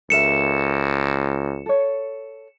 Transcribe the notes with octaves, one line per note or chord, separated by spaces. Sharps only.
C#2 A4 A#4 E5 C#7 E7
A4 C#5